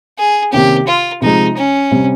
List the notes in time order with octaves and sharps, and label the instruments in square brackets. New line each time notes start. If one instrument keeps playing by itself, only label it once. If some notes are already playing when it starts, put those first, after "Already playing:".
[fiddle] G#4
[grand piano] C3 D#3 A#3 C#4 [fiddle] G4
[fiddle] F4
[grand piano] C3 F3 G#3 [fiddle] D#4
[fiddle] C#4
[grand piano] C3 G3 C4